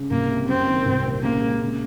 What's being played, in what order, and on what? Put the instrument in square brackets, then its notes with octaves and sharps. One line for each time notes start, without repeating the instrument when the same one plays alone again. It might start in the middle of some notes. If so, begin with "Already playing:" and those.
Already playing: [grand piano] C#3
[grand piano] C2 [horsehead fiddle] A#3
[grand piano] C3
[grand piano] F#2 [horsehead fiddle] C4
[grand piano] D#3
C2
A#2
[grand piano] C#3 [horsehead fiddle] A#3
[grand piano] G#3
C#3